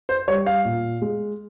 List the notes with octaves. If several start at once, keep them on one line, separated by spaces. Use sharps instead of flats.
C5
G3 C#5
F5
A#2
G#3